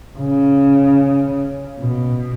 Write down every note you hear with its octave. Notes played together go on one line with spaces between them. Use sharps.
C#3
B2